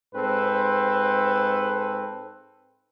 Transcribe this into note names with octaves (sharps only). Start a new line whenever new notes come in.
G#2 C4 A4 B4